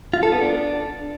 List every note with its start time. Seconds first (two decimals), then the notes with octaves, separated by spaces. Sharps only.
0.14 F4
0.23 A4
0.32 B3
0.41 D4